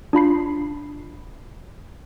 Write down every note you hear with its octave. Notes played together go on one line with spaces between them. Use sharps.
D4 F4 B5 C7